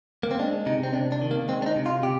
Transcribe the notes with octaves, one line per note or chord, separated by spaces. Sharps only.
A#3
C4
G#3 D4
C3 D#4
C4
C3 D4
D4
D#3
A#3
G#3 C4
D4
D#4
C3
F4
C3 G4